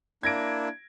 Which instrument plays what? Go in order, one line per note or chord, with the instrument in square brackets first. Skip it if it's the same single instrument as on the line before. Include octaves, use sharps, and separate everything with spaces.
[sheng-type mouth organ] A#3 D4 E4 [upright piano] G#6 A#6 D7